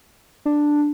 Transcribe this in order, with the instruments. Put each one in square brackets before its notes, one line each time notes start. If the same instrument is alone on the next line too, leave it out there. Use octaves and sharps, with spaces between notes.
[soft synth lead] D4